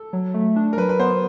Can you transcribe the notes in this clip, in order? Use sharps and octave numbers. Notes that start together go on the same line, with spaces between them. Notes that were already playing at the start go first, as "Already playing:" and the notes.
Already playing: A4
F#3
A3
D4
A#4
F#3 B4
B4
B3 C5